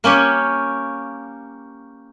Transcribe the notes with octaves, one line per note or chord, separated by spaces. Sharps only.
A#3 C#4 G4 C#5